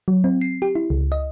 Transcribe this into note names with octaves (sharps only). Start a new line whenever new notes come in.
F#3
C4
C7
G4
E4
C#2
D#5